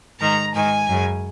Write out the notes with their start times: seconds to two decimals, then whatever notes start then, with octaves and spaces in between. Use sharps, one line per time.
0.20 G#2 D#3 A#5
0.54 G#2 D#3 G#5
0.88 F#2 C#3